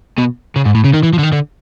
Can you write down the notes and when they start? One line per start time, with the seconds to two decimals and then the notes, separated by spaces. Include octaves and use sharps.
0.18 B2
0.56 C#3
0.65 G#2
0.75 A2
0.84 C#3
0.94 D#3
1.03 E3
1.13 F3
1.18 D3
1.23 D#3
1.32 D3